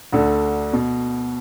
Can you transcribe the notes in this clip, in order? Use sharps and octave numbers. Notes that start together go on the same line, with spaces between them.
D2 D3
B2